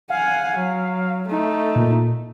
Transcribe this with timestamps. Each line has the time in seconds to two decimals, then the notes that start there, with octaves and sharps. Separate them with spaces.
0.10 F5 F#5 G#5
0.57 F#3
1.27 A3 D#4
1.76 A#2